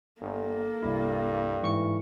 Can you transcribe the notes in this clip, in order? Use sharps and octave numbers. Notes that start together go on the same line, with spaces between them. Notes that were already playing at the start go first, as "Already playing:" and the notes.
G1 A#3 A4
C2 G2 E4
G#2 E3 C#6 C#7